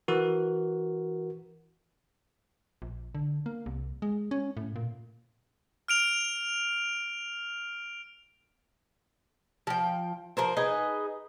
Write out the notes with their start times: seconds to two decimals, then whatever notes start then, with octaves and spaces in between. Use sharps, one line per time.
0.08 E3 F#4 A#4
2.82 A#1
3.15 D3
3.46 A#3
3.66 C2
4.02 G#3
4.31 C#4
4.57 A2
4.76 A#2
5.88 F6 D7 F7
9.67 F3 G5
10.37 F3 A#4 C5
10.57 D#4 G#4 B4 D#5